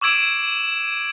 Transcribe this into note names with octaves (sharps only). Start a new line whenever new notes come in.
C#6 D6 E6 G#6 D7 E7